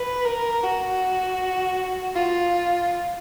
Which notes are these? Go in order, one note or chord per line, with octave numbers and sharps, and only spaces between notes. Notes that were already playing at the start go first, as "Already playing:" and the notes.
Already playing: B4
A#4
F#4
F4